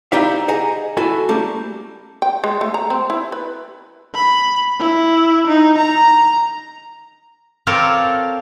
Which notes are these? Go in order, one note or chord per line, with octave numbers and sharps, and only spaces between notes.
D#4 E4 G4 D5 E5 F5
G#4 D#5 F#5 G#5 A#5
E4 F#4 A4 G#5
G3 A3 A#3 C#4
G5
G#3
A3
A#5
C4
E4
B4
B5
E4
D#4
A#5
C4 F4 A4 A#4 C#5 D5